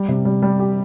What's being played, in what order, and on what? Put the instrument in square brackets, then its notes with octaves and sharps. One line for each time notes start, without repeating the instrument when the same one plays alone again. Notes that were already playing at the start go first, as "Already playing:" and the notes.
Already playing: [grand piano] G3
C3
G3
G3
G4